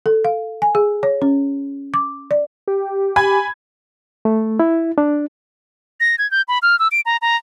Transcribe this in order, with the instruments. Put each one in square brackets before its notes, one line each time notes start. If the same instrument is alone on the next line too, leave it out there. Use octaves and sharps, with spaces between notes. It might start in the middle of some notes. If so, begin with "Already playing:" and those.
[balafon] A4
F5
G#5
G#4
C#5
C#4
D6
D5
[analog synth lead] G4
[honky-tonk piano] G#5 B5 G#6
[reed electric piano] A3
E4
D4
[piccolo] A#6
G#6
G6
B5
F6
E6
D7
A#5
A#5